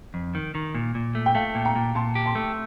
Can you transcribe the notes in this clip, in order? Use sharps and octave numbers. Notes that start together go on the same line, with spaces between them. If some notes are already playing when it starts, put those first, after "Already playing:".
F2
D#3
D#3
A#2
A#2
A3
G5
A3 F5 A5
A#2
G5 A#5
A#2
A#2 A5 C6
G4
A5 C6
A3